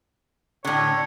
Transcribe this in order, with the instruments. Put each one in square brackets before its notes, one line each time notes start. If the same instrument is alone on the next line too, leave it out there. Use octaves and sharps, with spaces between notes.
[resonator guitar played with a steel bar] A2 D3 [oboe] C#5